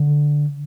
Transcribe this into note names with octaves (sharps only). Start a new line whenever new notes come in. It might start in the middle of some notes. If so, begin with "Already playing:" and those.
Already playing: D3